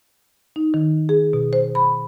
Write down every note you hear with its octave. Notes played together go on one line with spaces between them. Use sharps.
D#4
D#3
G#4
B2
C5
B5